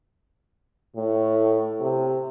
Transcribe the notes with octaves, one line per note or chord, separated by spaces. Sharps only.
A2
C3